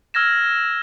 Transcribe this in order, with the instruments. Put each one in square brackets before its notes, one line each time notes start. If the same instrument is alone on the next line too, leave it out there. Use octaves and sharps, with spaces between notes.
[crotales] E6 F6 G#6 A#6 E7